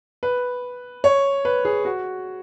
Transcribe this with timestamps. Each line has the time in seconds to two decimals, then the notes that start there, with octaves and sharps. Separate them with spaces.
0.23 B4
1.04 C#5
1.45 B4
1.65 G#4
1.85 F#4